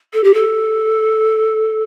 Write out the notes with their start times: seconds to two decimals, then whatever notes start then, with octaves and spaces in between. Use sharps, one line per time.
0.13 A4
0.23 G4
0.33 A4